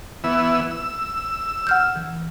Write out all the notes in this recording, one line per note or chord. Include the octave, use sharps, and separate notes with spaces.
E3 B3 E6
E6
F#5 F6 G6
E3